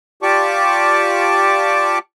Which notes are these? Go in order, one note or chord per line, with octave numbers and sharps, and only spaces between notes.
F4 G4 D5 A5 C#6 D6